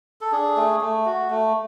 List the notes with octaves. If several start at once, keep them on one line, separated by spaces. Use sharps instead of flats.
A4
D4 G#4
A3
A3
F#4
A3